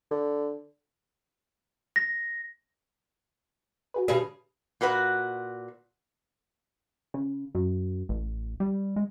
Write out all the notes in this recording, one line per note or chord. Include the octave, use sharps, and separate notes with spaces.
D3
A#6
F#4 G#4 B4
B2 D3 G3 G#4
A#2 F#4 B4 F#5
C#3
F#2
A1
G3
G#3